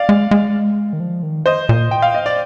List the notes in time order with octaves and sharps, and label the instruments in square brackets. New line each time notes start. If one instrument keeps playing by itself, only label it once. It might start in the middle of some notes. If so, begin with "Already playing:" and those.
Already playing: [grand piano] D5 F5
[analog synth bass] G#3
G#3
D#3
F3
D#3
[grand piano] C5 D#5
[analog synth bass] A#2
[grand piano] G5
F5
D#5
D5